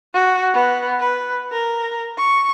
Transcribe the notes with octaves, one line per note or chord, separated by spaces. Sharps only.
F#4
B3
B4
A#4
C#6